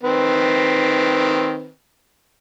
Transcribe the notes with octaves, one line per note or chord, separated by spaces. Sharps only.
D#3 C4 B4